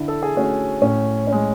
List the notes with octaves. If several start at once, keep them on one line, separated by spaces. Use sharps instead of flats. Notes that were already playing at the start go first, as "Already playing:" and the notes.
Already playing: D3 E4
A4
G#4
A3 C#4 F#4
A2 C#4
G#3 C#4